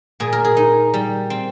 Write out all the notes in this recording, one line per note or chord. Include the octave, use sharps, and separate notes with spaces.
A#2 G#4
A#4
G#4
D#4
G3
C4